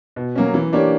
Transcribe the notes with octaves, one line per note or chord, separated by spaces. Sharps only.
B2
F#3 A#3 C#4
E3
A#3 D4 G4 C#5